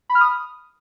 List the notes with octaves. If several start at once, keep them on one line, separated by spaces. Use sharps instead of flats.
B5
F6
D#6